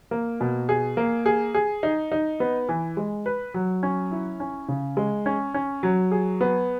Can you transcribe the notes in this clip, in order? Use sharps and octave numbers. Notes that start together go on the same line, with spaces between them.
A#3
B2
G#4
A#3
G#4
G#4
D#4
D#4
B3
E3
G#3
B4
F#3
C#4
E4
C#4
C#3
G#3
C#4
C#4
F#3
G#4
B3